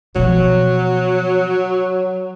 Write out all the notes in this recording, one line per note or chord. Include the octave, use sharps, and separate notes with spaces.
B2 F3 F#3